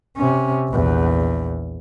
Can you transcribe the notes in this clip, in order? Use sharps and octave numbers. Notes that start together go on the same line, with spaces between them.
C3 C#4
A#1 E2